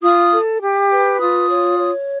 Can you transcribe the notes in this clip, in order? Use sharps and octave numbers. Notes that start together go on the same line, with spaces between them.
F4 D#6
A4
G4
B4
F4 D#6
C#5
C#5